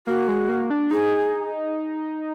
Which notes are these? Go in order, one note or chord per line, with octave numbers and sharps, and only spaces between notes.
A#3 F#4
G#3
A#3
D4
D#4 G#4